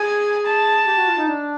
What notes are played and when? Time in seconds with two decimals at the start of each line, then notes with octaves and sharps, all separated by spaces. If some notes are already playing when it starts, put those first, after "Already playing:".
Already playing: G#4 G#5
0.46 A5
0.86 G4
0.98 F#4
1.07 F4
1.17 D#4
1.28 D4